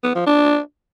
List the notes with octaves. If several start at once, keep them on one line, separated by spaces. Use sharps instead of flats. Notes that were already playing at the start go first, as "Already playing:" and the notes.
B3
F3
D4